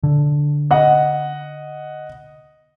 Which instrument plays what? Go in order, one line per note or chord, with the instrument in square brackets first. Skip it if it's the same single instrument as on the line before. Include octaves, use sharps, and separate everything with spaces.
[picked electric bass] D3
[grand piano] D#5 F#5